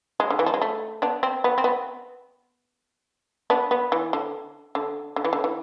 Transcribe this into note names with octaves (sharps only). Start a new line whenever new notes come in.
G#3
D3
E3
F3
G#3
A3
B3 D4
C4
B3
C4
B3
B3 D4
B3
E3
D3
D3
D3
E3
D3
E3